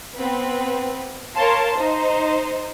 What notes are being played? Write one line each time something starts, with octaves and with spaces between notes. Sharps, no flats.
B3 C4 B4
A#4 C#5 F5 A5 C6
D#4 C5